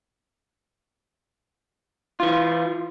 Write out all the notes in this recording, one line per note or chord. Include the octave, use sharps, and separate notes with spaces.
E3 F4